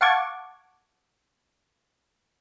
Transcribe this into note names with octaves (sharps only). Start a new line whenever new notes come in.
F5 F#5 A5 C#6 D6 G#6